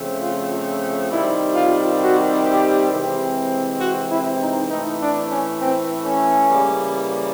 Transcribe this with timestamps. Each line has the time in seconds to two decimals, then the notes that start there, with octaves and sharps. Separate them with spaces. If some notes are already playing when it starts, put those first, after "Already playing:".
Already playing: C#3 F3 A3 C4
0.20 F4
1.10 C3 D#3 G3 C4 E4
1.55 F4
2.00 F#4
2.45 G4
2.90 C3 E3 G#3 C4
3.80 F#4
4.10 E4
4.40 D#4
4.70 A2 E3 A3 C4 D#4
5.00 D4
5.30 C#4
5.60 C4
6.04 C#4
6.49 C#3 E3 G3 A#3